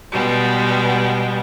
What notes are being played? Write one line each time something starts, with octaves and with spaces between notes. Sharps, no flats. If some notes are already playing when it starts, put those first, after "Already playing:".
B2 G3 G#3 B3